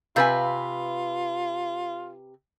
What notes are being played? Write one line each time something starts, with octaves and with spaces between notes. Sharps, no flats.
C3 F4 B4 F5 G#5 G6 A6